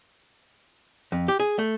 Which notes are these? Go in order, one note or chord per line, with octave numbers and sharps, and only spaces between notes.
F2
G4
G#4
A3